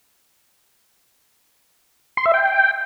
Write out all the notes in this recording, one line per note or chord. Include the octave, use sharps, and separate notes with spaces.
C6
E5
G5